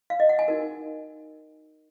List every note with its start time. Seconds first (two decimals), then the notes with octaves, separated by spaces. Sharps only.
0.10 F5
0.20 D#5
0.29 F#5
0.39 G#5
0.48 D#4 F#4 A#4